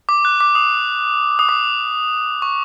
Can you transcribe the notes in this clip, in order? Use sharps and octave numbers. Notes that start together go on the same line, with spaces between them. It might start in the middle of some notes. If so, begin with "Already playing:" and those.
D6
F#6
D6
D#6
D#6
D6
C#6